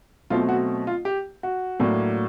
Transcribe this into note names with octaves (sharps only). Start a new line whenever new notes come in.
B2 F#3 A3 C4 F4
F#4
F4
G4
F#4
A2 F#3 A#3 D4